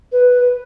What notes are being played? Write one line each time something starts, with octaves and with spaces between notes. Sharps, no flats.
B4